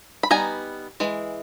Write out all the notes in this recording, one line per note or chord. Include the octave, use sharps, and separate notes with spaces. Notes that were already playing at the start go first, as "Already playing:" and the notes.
B5
G3 B3 D#4 G#5 A#5
E3 G#3